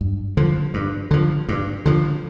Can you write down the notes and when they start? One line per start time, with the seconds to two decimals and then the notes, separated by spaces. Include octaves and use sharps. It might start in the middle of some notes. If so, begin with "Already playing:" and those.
0.01 G2
0.37 D3 F3
0.74 G2
1.11 D3 F3
1.49 G2
1.86 D3 F3